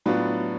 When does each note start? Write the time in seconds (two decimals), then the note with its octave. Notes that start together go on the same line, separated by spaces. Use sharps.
0.06 A2 F#3 B3 D4 F4